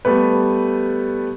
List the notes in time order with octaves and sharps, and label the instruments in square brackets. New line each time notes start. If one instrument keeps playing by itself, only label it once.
[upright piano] G3 A3 B3 B4